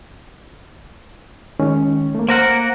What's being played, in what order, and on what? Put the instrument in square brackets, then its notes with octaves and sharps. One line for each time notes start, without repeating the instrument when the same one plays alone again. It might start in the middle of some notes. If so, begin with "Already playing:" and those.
[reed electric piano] D#3 G#3 C#4
A3 A#3
[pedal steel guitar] A#3 A#4 F#5 [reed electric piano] C5